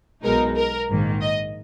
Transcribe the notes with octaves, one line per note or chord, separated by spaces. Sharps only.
B1 B2 G#3 D#4 A#4
A#4
A#1 G#2 D#3 A#3
D#5